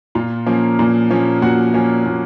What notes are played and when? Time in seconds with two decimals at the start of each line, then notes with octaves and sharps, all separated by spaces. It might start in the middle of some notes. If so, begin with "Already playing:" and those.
0.15 A#2 F4 F5
0.47 F3 A#3 C#4
0.79 A#2
1.10 F3 A#3 C#4
1.42 A#2 F#4 F#5
1.74 F3 A#3 C#4
2.06 A#2